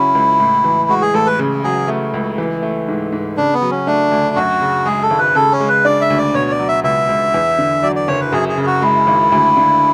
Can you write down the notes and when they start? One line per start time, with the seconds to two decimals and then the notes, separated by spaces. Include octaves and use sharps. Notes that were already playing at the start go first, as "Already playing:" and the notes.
Already playing: C#3 F#3 C#4 E4
0.15 C#2
0.40 A2
0.64 E3
0.89 G#3 F#4
1.01 G#4
1.14 A1 A4
1.27 B4
1.39 C#3
1.64 F#3 G#4
1.88 A3
2.14 C#2
2.38 E3
2.62 A3
2.88 G#2
3.12 G#2
3.37 C#3 D4
3.53 B3
3.62 F#3
3.71 C#4
3.87 A3 D4
4.12 D2
4.36 F#2 F#4
4.61 C#3
4.86 G#3 G#4
5.02 A4
5.10 G#1
5.19 B4
5.35 C#3 A4
5.52 C#4
5.60 G#3
5.69 B4
5.85 D4 D5
6.01 E5
6.10 D2
6.18 D5
6.34 B2 C#5
6.51 D5
6.59 F#3
6.68 E5
6.84 C#2 E5
7.09 C#2
7.34 E2
7.58 D3
7.83 F#3 D5
7.96 D5
8.08 F#1 C#5
8.20 B4
8.32 F#2 G#4
8.49 G#4
8.57 C#3
8.66 F#4
8.82 G#3 E4
9.07 G#1
9.32 D2
9.57 D3